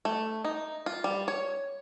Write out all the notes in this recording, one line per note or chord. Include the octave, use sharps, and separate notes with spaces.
A3
D#4
F4
G3
C#5